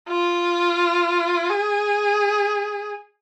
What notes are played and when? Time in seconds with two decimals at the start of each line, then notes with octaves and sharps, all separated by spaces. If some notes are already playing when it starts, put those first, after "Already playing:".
0.08 F4
1.50 G#4